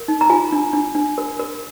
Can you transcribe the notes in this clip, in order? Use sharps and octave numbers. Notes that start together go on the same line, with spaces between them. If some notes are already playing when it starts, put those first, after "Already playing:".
Already playing: A#4
D#4
A#5
F4 G#5
D4
D4
D4
A#4
A#4